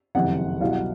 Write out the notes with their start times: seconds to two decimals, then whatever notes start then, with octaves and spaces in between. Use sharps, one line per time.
0.15 F#1 F2 C3 D#3 F#5
0.60 C2 B2 F#3 F5
0.71 F#5